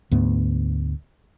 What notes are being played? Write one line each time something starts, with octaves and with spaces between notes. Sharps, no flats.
D2 G#2 A3 B3